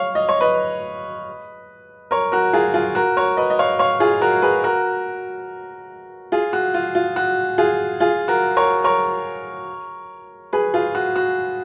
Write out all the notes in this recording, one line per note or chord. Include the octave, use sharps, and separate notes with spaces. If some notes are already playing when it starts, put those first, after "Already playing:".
Already playing: C#5 F5
D#5
C#5
B4 D#5
A#4 C#5
F#4 A#4
F4 G#4
F4 G#4
F#4 A#4
A#4 C#5
B4 D#5
D#5
C#5 F5
C#5 F5
F4 G#4
F#4 A#4
G#4 B4
F#4 A#4
F4 G#4
F#4
F4
F4
F#4
F4 G#4
F4 G#4
F#4 A#4
A#4 C#5
A#4 C#5
G#4 B4
F4 G#4
F#4
F#4